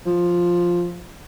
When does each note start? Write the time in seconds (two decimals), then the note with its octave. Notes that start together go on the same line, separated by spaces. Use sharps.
0.06 F3